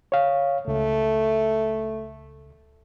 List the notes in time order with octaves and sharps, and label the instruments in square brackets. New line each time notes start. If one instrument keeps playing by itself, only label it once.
[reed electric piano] C#5 F5
[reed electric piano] C#2 [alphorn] A3